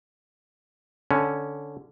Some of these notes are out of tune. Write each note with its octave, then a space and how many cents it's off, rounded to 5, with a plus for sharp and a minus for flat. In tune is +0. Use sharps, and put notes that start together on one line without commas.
D3 -5 C#4 +0